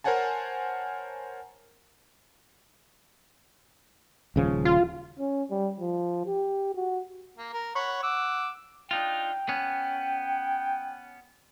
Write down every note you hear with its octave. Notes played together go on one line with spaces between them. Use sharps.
A#4 C5 C#5 F#5 G#5 A5
D#1 C#3 F3
F4
C#4
G3
F3
G4
F#4
A#3
A#4
C#5 F#5 B5
F#5 D6 E6
D4 D#4 F4 G5
B3 C#4